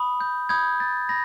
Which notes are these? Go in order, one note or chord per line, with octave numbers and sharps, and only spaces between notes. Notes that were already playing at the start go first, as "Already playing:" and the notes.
Already playing: B5 D#6
G6
B5 D#6 G6 G#6
A6
B5 A#6